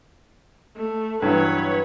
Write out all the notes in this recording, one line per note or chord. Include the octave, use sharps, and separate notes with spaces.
A3
G2 E3 F#3 B4 C#5